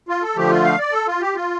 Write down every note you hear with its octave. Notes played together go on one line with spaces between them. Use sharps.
F4
A4
D3 F3 A3 G4
F4
F5
D5
A4
F4
G4
F4